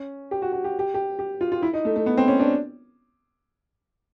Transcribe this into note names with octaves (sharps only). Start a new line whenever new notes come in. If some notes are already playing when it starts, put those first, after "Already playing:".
Already playing: C#4
G4
F#4
F#4
G4
G4
G4
G4
F4
F4
E4
D#4
A3
A3
B3
C4
C#4
D4